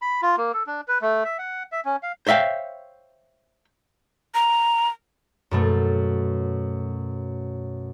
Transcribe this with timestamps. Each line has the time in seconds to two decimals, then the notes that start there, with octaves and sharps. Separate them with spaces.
0.02 B5
0.22 F4
0.38 A#3
0.54 A4
0.67 D4
0.88 B4
1.01 A3
1.24 E5
1.38 F#5
1.72 E5
1.85 C#4
2.03 F5
2.27 C5 C#5 E5 F5 G5
4.35 A#5
5.51 F#2 B2 A3